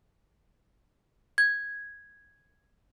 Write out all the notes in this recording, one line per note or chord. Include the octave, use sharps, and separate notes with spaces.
G#6